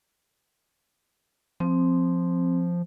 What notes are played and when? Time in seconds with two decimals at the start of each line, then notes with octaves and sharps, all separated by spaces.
1.60 F3 C4